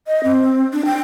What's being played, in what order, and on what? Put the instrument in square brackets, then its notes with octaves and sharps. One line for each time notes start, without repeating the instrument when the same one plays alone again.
[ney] D#5
C4
D4
G5